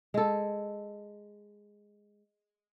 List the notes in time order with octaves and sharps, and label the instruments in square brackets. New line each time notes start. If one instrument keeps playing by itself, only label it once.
[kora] G#3 A4